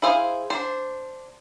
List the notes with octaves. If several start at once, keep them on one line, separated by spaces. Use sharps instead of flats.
E4 G#4 C5 F5
D4 C5